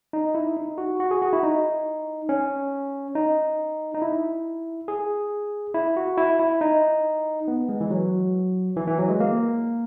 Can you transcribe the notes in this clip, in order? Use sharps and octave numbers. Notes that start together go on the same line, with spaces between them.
D#4
E4
D#4
F#4
F#4
G#4
F#4
E4
D#4
C#4
D#4
D#4
E4
G#4
E4
F#4
E4
E4
D#4
B3
G#3
E3
F#3
E3
E3
F#3
G#3
A#3